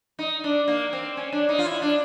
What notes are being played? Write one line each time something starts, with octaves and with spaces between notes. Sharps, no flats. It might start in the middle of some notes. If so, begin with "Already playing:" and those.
D#4
D4
A#3
C4
C#4
D4
D#4
F4
E4
D4